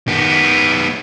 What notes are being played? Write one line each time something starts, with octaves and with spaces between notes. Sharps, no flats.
D#3 B3